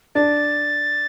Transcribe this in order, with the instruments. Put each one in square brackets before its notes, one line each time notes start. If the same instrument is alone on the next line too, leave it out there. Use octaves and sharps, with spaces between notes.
[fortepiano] D4 [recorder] A6